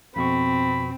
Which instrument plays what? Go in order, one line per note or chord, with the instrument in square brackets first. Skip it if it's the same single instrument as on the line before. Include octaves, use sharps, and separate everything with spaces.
[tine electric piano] F2 B2 C#6 [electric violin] C4 [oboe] B5